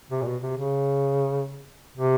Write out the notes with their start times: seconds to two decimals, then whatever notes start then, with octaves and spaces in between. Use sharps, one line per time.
0.11 C3
0.22 A#2
0.26 B2
0.42 C3
0.57 C#3
1.97 C3